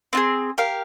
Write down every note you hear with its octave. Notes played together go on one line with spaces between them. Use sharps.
C4 F4 G#4
G4 A#4 F5